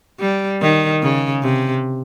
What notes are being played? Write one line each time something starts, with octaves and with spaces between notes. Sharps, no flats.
G3
D#3
C#3
C3